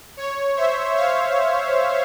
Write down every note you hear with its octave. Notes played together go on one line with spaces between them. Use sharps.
C#5
C5 E5
C#5 F5